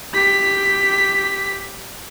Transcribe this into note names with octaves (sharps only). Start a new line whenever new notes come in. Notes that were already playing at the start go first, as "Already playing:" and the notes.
G4 B6